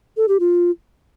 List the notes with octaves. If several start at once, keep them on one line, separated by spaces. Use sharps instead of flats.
A4
G4
F4